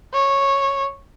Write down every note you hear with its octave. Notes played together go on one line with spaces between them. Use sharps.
C#5